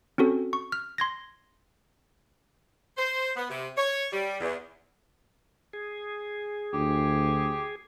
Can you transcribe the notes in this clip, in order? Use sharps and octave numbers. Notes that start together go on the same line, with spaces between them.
C4 C#4 F#4 A4
C#6
F6
C6 G#6 A#6
C5
B3
C3
C#5
G3
E2
G#4
D2 G4